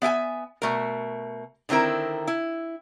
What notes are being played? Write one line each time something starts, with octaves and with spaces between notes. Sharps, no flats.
B3 E5 G5 G#5
B2 A3 A#4
D3 D#3 C4 E4 A#4
E4